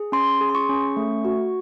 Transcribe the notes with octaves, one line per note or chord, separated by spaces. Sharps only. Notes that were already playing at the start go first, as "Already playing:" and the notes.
Already playing: G#4
C#4 C6
G#4
C6
C#6
C#4
A3
F#4